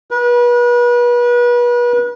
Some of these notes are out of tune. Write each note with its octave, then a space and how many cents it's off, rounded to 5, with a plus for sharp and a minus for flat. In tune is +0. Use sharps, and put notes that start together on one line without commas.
B4 -35